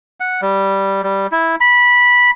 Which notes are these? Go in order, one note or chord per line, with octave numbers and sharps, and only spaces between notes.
F#5
G3
G3
E4
B5